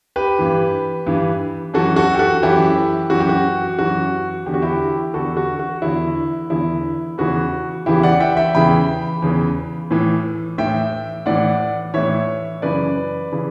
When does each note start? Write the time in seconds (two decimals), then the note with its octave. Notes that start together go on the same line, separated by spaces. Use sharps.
0.16 G4 B4
0.39 G2 E3
1.07 G2 E3
1.74 F#2 E3 F#4 A4
1.96 F#4 A4
2.14 G4
2.19 F#4 A4
2.43 F#2 E3 E4 G4
3.10 F#2 E3 F#4
3.20 G4
3.29 F#4
3.79 F#2 E3 F#4
4.46 E2 D3 G4
4.54 F#4
4.62 E4 G4
5.14 E2 D3 F#4 A4
5.37 F#4
5.59 F#4
5.82 E2 D3 E4
6.50 E2 D3 E4
7.18 E2 C#3 E3 F#4
7.86 E2 C#3 E3 E4 G4
8.03 D5 F#5
8.20 E5 G5
8.37 E5 G5
8.54 E2 C#3 E3 G5 B5
9.22 E2 C#3 E3
9.91 A2 E3
10.58 A2 E3 E5 G5
11.26 A2 E3 D5 F#5
11.94 A2 E3 C#5 E5
12.62 F#2 C#3 E3 B4 D5
13.32 C#3 E3